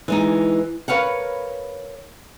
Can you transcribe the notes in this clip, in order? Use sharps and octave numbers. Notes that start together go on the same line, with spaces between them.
E3 G#3 D#4
A#4 B4 C#5 F5 F#5